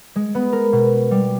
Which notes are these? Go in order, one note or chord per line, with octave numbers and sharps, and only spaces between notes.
G#3
B3
A#4
B2
G3